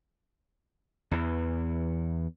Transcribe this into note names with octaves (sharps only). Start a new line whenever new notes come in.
E2 E3